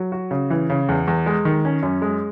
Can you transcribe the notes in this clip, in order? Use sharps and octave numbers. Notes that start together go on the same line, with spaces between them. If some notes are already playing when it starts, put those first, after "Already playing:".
Already playing: F#3
F#4
C#3
E3
C#3
E2
E2
G#3
D#3
C#4
F#2
G#3